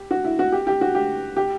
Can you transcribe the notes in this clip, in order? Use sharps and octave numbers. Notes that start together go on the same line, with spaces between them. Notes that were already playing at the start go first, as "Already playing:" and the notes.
Already playing: G4
F#4
E4
F#4
G4
G4
F#4
G4
G4